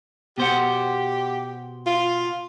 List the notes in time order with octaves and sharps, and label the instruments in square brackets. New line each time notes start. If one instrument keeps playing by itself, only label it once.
[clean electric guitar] B2 C5 F#5 [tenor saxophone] G4
[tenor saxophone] F4